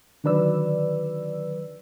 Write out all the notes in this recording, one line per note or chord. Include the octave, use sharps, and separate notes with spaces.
D3 D#3 F#3 B4 D5 E6